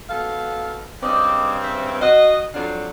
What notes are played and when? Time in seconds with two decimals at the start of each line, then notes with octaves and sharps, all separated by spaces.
0.10 B2 A4 F5
1.02 G2 C#3 C4 D5 D#5
1.64 E5
2.01 F#4 D#5 F5
2.54 F2 F#3 D4 F5